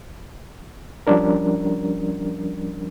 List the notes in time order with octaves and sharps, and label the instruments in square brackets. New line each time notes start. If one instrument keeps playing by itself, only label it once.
[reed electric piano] F3 G3 C#4 D4 A#4